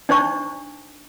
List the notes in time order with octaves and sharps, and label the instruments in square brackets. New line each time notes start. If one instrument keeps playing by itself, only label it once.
[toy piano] D4 D#4 C5 A5 C#6